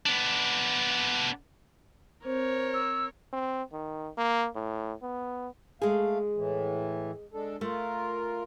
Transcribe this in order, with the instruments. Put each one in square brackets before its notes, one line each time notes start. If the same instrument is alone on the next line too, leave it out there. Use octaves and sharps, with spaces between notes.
[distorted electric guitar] B3 D4
[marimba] C4 [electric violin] A#4 C#5 [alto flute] C5
[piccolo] E6
[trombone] C4
D#3
A#3
A2
B3
[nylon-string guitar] G#3 G#4 [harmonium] A3 F5
[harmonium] A2 E3
G#3 D4 A4
[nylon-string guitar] A3 [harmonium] F4 A#4